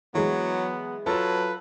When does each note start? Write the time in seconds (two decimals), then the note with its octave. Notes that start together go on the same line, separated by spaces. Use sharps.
0.15 E3 F#3 G#3 B3
1.06 F#3 F4 A4 B4 A5